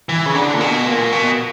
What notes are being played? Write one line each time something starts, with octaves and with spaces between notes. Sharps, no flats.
E3
C#3
D3
A#2
B2
A#2
B2